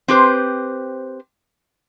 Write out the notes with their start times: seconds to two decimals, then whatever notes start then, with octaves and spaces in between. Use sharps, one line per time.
0.08 C4 G4 B4 C5